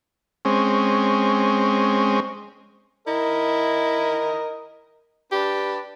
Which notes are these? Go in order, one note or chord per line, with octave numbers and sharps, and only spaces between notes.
G#3 C4 C#4
E4 A#4 D#5
D4 G4 B4